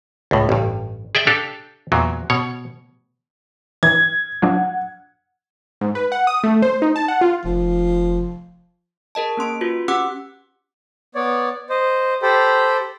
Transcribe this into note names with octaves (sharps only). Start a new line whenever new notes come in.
C#2 A2
A1 G2
G#4 D5 E5 G5
D4 G4 A4 F5
E2 A#2 F#3
B2 C#5
E3 G#6
F3 F#3 D4 F#5
G#2
B4
F#5
D#6
A3
C5
D#4
A5
F#5
F4
F1 F3
G#4 A#4 D#5 A5
A#3 C#4 C6 D7
F4 F#4 B4
C#4 G4 F#5 D6 E6 F#6
B3 C#5 D5
C5 D#5
G4 A4 C5 G5 B5